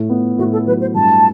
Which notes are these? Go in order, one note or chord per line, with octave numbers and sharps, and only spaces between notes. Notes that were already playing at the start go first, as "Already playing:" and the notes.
Already playing: A2 A3
B3
A2 F#4
A4
F#3 B4
C5
G2 A5